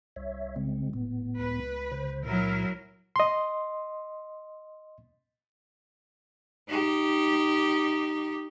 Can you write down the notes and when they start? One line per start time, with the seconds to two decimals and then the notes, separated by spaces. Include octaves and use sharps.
0.16 C2 C#5 E5
0.56 C#3 G#3 C4
0.93 D#1 A2 B3
1.39 C#2 B4
1.91 C#3 C5
2.25 A#2 F#3 E4 A#4
3.16 D#5 C6
6.69 D#4 G4